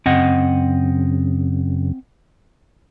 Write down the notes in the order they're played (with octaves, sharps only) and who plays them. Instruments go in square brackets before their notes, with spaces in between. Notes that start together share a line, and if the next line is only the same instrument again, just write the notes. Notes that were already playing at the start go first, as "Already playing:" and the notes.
[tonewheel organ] F#2 C#3 [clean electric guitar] C4 D#5 F#5